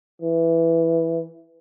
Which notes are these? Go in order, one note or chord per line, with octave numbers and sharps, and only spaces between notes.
E3